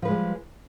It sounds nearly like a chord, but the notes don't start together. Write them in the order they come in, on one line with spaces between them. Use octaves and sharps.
F3 B4 G#3 G3